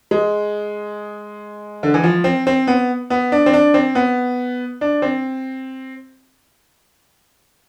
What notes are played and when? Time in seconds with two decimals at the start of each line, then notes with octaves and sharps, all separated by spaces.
0.11 G#3
1.83 D3
1.94 E3
2.04 F3
2.24 C4
2.47 C4
2.67 B3
3.10 B3
3.32 D4
3.46 C4
3.53 D4
3.74 C4
3.95 B3
4.81 D4
5.02 C4